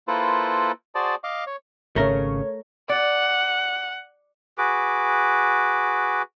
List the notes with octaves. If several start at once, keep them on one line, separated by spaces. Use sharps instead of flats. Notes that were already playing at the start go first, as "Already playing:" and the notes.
A#3 E4 F4 A4 B4 C5
F#4 G#4 C5 D5 A5
D#5 F5 D6
C#5
G#1 C#3 A3 A#4 C#5
D5 F#5
F#4 G#4 B4 D6